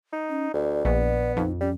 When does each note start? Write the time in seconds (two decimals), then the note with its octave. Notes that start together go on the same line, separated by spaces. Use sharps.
0.13 D#4
0.30 C#4
0.54 D2 D5
0.85 A#1 B3
1.37 F2 D#4
1.61 G3 C#4